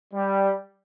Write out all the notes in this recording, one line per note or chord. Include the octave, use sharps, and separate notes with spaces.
G3